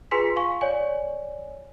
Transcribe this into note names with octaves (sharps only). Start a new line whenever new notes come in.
F4 G#4 B4 G#5 C6 B6
F5 G#5 C#6
C#5 D5 G#5